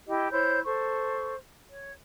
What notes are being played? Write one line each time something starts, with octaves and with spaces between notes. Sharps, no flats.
E4 G4 D#5
E4 C5 C#5 G6
A4 C5 C#6
C#5